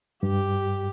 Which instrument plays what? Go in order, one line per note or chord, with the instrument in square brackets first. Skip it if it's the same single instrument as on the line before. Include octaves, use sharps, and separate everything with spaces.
[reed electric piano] G2 [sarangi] G4